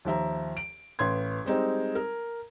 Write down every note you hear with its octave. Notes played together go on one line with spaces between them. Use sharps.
D#2 F3 E5 A#5
D7
A1 B4 C6 G#6
G3 G#3 C4 D#4
A#4